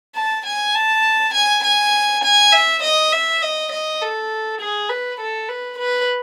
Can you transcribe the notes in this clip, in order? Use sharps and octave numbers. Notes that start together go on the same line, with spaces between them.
A5
G#5
A5
G#5
G#5
G#5
E5
D#5
E5
D#5
D#5
A4
G#4
B4
A4
B4
B4